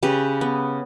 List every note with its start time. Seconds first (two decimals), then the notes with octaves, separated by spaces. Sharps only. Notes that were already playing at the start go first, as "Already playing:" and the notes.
0.03 C#3 G4 B4
0.41 B3